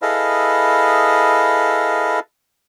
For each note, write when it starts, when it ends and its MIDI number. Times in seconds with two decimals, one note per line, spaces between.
0.02 2.20 64
0.02 2.20 68
0.02 2.20 69
0.02 2.20 71
0.02 2.20 75
0.02 2.20 77